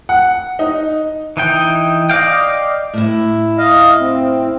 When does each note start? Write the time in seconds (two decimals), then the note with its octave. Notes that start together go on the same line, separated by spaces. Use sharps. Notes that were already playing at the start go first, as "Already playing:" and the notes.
0.09 F#5
0.59 D#4
1.37 E3 D#4 G5
2.10 D5 D#5 F5 G5
2.94 A2 E4
3.58 D#5 F5
4.00 C4